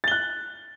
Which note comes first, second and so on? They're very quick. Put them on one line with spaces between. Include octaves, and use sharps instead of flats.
A6 G7 F#6